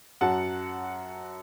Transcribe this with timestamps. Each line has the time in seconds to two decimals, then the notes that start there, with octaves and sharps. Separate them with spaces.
0.21 F#2 F#3 F#5 A5